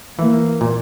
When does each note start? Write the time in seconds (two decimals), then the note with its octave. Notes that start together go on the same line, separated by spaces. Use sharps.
0.19 E3 A#3
0.61 A#2